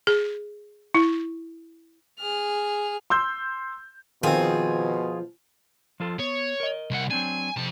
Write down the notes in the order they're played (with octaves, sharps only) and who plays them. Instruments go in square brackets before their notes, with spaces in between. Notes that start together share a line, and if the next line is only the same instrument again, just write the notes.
[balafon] G#4
E4
[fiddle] G#4 F6
[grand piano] C6 E6 G6
[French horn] B2 [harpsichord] D#3 C4 [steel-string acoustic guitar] F3 [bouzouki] F4 G#4
[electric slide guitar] F3 F4 A4
[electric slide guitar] B3 [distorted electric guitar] C#5
[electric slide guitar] A#4 D#5
[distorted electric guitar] C2 F#5
[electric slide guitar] F#3 C4 D4 [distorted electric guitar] G#5
[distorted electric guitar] F2 A5 [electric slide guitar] C3